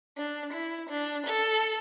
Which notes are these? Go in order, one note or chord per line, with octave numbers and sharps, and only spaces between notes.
D4
E4
D4
A4